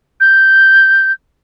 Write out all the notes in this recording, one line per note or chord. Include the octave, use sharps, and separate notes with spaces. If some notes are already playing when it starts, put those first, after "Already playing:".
G6